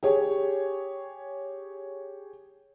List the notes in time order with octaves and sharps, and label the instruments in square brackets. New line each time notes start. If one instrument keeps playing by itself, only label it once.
[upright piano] G4 G#4 C#5